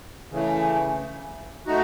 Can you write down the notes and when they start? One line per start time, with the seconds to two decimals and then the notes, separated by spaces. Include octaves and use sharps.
0.31 C#3 E3 A3
1.66 A3 D#4 F#4